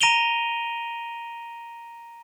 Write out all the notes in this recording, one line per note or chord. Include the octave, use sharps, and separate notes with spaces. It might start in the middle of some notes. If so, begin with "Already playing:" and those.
A#5 A#6 D7 D#7 F7 G7